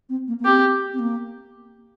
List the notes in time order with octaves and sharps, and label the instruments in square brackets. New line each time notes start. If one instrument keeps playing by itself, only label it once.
[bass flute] C4
A#3
A#3
[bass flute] C4 [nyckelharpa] G4
[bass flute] C4
A#3